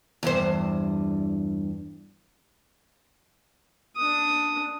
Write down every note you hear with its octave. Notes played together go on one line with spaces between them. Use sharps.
E2 G2 C5
D4 D#6